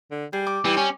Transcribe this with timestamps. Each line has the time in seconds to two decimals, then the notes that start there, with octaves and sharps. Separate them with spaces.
0.11 D3
0.33 G3 G#4
0.47 D6
0.65 E3 G3
0.77 C#4